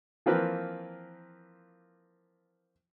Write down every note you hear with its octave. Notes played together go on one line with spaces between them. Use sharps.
E3 F3 A#3 C4 B4